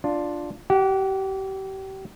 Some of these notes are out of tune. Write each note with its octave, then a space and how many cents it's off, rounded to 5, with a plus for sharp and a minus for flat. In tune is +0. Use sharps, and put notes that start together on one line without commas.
D4 +0 F4 +0
G4 -30 F#5 +0